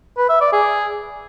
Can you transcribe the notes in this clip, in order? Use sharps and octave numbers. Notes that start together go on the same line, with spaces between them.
B4
E5
D5
G#4